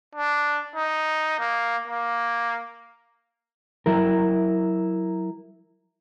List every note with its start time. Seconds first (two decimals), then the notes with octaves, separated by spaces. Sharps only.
0.15 D4
0.76 D#4
1.39 A#3
1.88 A#3
3.86 F#3 E4 A#4